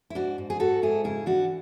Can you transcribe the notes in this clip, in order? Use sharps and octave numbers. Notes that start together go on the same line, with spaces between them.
E4
G#2 D4 F#4
G#2
G#4
G#2 F#4 A4
G#2 E4 G#4
C#3 E4 G#4
E3 D4 F#4